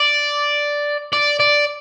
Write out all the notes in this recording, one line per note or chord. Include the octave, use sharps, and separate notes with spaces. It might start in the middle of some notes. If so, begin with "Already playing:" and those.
Already playing: D5
D5
D5